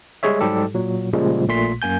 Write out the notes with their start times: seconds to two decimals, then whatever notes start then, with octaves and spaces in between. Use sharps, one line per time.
0.23 G3 G#3 G#4 C#5 E5
0.41 G#2 F#3 G3 G4 A4
0.74 A#2 F#3
1.13 A#2 C#3 F3 G3 G#3
1.47 A#1 A#2 A3 C6 B6
1.82 F#2 A#3 G#5 G6